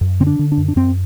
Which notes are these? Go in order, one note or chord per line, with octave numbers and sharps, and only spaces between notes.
F#2
D3 C4
D4
D3
D4
F#2
D4
F#2 C4